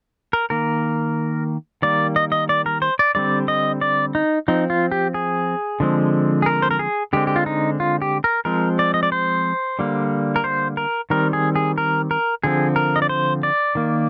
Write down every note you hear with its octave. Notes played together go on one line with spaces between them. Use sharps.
A#4
D#3 A#3 A#4
D#3 G3 A#3 D5
D#5
D#5
D5
A#4
C5
D5
D3 G3 C4 D5
D#5
D5
D#4
F3 C4 D#4
F4
G4
G#4
D3 F3 G#3 C4
G#4
A#4
C5
A#4
G#4
D3 G#3 C4 G4
G4
F4
D#4
F4
G4
A#4
F3 G#3 C4 A#4
D5
D#5
D5
C5
D3 G3 A#3
A#4
C5
A#4
D#3 G3 C4 A#4
G#4
G#4
A#4
A#4
D3 F3 C4 G#4
A#4
D#5
D5
C5
D5
D#3 A#3